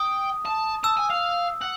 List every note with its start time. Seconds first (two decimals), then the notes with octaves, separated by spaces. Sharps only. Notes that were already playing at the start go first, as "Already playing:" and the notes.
Already playing: G5 D#6
0.46 A5
0.84 A5 E6
0.97 G#5
1.10 F5
1.61 F#5